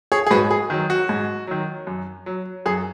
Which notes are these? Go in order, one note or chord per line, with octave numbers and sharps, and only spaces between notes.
G#4 C#5
G#4
G#2 F#4 B4
G#4
D#3 F#3
F#4
G#2
D#3 F#3
F#2
F#3
F#2 G#4